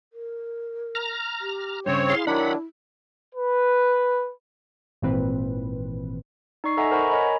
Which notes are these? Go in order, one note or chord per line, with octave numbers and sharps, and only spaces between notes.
A#4
A#5 F6
G4
G2 C#3 C4 C5 C#5
E4 G#4 F5 C6
D#3 F#3 D4 F#5 B5
B4
G#1 A#2 D#3 E3 C4 B4
D#4 D5 C#6 C7
A4 D#5 E5 F#5 G#5 A#5
A#4 C5 F#5 A#5 B5 C#6
A#4 C#5 D#5 G#5 A#5 B5